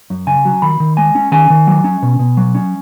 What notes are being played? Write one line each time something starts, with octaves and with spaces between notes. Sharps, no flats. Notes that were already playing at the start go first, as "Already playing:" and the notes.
F#2
C#3 G#5
F#3
D#3 B5
D#3
G#3 G#5
C#4
D#3 G#5
D#3
F#3
C#4
B2
B2
F#3
C#4